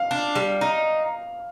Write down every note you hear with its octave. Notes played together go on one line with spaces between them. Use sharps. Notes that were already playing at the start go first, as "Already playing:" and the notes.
Already playing: F5
D4
G3
D#4